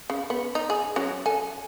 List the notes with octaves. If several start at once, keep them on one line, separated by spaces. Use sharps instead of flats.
C#3
B3
D#4
G#4
F#3 C#4
A4 G#5